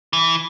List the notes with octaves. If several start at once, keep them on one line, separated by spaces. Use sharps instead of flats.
E3